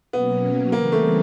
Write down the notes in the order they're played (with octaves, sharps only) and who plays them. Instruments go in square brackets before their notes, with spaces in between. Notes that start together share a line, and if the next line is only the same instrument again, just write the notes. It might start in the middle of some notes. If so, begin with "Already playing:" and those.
[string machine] B2 F#3 A#3 C#4 [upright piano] B3
[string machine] C#3 E3 G3 C4 [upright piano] A#3
[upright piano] A3